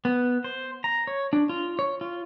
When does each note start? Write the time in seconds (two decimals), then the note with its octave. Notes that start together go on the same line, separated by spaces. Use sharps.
0.05 B3
0.44 C5
0.84 A#5
1.07 C#5
1.33 D4
1.49 F4
1.79 C#5
2.01 F4